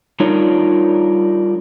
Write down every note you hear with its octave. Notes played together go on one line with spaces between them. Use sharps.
G3 D4 D#4 F4 A#4 C#5